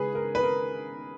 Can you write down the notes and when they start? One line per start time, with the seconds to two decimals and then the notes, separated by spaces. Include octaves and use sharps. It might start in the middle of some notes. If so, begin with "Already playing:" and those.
Already playing: C#3 G#3 G#4 B4
0.15 A#4
0.35 B4
0.43 A#4